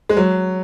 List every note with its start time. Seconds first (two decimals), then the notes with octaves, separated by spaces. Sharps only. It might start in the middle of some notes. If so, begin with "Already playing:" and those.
0.09 G#3
0.17 F#3